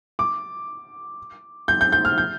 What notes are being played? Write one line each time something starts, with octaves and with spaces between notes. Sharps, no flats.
D6
G6
G6
G6
F6
G6